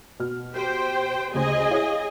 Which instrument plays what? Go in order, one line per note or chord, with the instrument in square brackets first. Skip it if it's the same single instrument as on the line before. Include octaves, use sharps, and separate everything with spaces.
[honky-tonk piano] B2 F6
[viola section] G4 C5 G5
[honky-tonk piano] D2 C#3 C5 [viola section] G#4 D#5 G#5
[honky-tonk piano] E4 C#5 F5